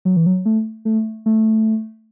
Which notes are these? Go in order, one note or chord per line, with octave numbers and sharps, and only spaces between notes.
F#3
E3
F#3
A3
A3
A3